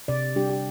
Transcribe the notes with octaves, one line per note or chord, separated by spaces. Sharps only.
C3 D5
G3 D4 G4
G4